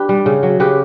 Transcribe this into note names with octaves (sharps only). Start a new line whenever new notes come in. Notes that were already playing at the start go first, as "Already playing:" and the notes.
Already playing: D4 G4 B4
G3
C#3
F#3
C#3 G4 B4